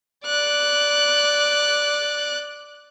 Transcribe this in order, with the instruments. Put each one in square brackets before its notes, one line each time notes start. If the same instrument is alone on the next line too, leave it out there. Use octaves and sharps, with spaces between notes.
[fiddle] D5 F#6